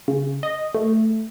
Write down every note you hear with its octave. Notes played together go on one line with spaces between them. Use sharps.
C#3
D#5
A3